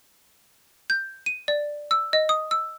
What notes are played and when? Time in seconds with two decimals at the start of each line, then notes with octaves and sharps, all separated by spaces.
0.90 G6
1.26 D#7
1.48 D5
1.91 E6
2.13 D#5
2.29 D#6
2.51 E6